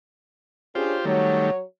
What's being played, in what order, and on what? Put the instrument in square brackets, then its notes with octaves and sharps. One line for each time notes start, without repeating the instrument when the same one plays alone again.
[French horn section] C#4 D4 G#4 [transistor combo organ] F4 G4 C5
[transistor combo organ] D#3 G3 A3 [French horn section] F#3 C#5